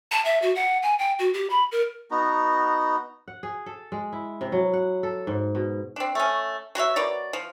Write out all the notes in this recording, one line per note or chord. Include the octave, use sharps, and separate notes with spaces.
A5
E5
F#4
F#5
G#5
G5
F#4
G4
B5
A#4
B3 D#4 F#4 A#5
F#5
G#4
A4
G#3
E4
C3
F#3
F#5
A4
G#2
B2
C4 D4
A3 C#4
F#3 F#4 C#5 E5
B2 A#4 C#5 D5
F3